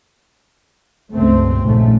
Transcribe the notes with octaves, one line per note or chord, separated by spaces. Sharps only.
C#2 G2 A3 C4
A#1 G#2 C#3 A3